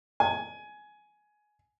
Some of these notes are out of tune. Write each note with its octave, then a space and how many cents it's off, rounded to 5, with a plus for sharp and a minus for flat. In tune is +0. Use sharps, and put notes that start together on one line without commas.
G#5 +15